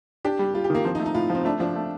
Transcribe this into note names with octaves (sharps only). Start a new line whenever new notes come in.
D4 G4
G3
G3 F4
G4
D#3 A#3
F3 C4
D#4
A3
D#4
A2 F4
F3
C4
A3 D4
F3 D4
A3